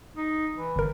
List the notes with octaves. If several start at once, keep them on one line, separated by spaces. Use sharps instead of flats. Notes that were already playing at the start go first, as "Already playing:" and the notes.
D#4
E3
G1 A#4